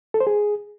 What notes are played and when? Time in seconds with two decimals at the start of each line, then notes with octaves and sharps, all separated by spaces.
0.14 A4
0.20 C5
0.27 G#4